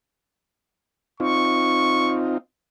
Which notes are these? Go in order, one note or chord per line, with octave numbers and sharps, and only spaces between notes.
C4 D#4 F4 C#6